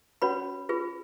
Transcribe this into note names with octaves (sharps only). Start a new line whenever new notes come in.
C#4 F#4 B4 C#5 B5
F4 G#4 B4